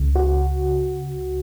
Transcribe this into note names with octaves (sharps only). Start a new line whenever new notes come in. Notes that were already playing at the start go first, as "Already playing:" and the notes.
Already playing: C#2 C#3
F#4